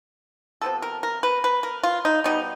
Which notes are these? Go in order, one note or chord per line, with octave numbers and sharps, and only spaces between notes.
C3 F3 G#3 B3 A4
A#4
A#4
B4
B4
A#4
F4
D#4
B2 G3 B3 D#4